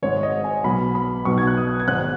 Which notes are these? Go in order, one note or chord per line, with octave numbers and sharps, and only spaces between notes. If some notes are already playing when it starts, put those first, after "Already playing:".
G#1 G#2 G#3 C#5
D#5
G#5
B1 B2 B3 B5
B5
B1 B2 B3 D#4 C#6
G#6
F#6
D#6
G#6
G#1 G#2 G#3 B3 F#6